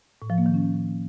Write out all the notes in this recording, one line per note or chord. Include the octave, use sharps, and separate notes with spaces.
A2
F3
A#3
D#3
C#4